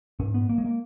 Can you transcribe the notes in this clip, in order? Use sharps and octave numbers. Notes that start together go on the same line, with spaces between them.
G#2 C#4
B3
A#3
G#3
A#3